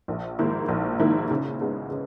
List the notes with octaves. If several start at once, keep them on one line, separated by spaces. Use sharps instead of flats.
A#1
G#2 D#3 A#3 E4
A#1
G#2 D#3 A#3 E4
C#3
G#3 B3
C#3